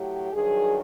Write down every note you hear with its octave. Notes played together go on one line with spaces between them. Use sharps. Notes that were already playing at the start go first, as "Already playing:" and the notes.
Already playing: A2 F#3 G4
G2 D#3 F#3 G#4